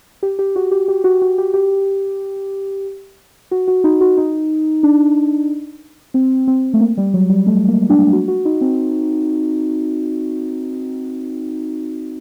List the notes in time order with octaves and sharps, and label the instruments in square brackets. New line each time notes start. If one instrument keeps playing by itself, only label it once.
[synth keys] G4
G4
F#4
G4
G4
F#4
F#4
G4
G4
F#4
F#4
D#4
F#4
D#4
D4
C4
C4
A3
A#3
G3
F#3
G3
A3
A#3
D4
F#4
F#4
D#4
C4